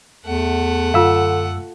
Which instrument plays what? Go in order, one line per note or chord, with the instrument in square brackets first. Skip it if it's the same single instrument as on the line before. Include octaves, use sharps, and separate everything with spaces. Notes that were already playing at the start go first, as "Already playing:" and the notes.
[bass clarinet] E2 [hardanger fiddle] A3 F#5
[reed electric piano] F#2 E6 [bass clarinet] D3 [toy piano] F4 F5